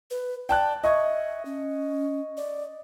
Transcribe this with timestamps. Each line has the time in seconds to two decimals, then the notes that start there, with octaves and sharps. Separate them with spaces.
0.11 B4
0.49 D5 G5 A5 F#6
0.84 D#5 E5 C#6 G#6
1.45 C#4
2.37 D5